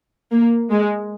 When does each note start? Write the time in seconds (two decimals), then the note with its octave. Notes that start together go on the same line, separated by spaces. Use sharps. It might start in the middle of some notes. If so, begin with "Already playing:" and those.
0.32 A#3
0.71 G#3